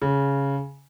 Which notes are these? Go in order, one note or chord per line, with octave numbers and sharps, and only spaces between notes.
C#3